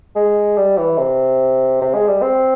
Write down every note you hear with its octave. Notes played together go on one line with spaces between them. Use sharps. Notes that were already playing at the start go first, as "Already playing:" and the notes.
G#3
G3
E3
C3
C3
G#3
G3
C4